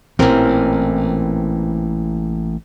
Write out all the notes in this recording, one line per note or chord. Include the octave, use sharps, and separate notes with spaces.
A1 A#2 E3 C4 A#4